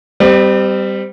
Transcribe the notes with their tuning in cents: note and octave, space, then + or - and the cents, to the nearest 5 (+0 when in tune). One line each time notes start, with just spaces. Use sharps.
G3 +0 C4 -25 D5 +40